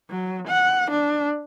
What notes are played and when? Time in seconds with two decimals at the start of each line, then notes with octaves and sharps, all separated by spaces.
0.11 F#3
0.48 F#5
0.91 D4